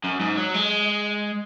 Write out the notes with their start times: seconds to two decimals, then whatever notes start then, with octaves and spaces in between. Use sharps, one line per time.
0.04 F#2
0.20 G#2
0.38 F#3
0.54 G#3